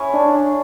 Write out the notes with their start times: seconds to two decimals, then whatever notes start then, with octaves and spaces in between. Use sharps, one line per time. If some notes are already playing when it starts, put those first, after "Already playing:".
Already playing: C#4 E4 G#4 C#5
0.14 D4